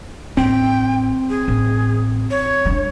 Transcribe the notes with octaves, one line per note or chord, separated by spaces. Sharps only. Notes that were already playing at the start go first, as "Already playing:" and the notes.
A1 C4 G5
G#4
A1
C#5
G3 D4